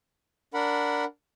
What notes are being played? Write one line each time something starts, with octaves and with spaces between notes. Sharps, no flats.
D4 A#4 F#5 B5